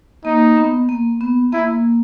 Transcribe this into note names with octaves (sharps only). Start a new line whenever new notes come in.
A#3 D#4
B3
A#3
B3
A#3 E4